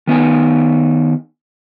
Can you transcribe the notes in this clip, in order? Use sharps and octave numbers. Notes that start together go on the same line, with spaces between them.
D#3 B3 D#4 G#5